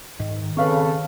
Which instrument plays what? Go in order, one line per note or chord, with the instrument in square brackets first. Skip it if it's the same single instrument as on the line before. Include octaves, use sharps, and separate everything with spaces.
[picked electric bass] G#2 [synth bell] D#3
[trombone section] C#3 A4 [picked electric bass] C4 [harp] B4 F5 C#6